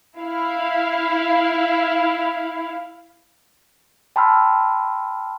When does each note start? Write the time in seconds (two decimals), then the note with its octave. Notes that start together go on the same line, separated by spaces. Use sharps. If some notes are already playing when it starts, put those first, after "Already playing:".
0.19 E4 F5
4.16 G5 A5 B5 C6 E6 F6